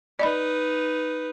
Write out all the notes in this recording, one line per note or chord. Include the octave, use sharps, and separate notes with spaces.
D#4 B4 D5 D#5 B5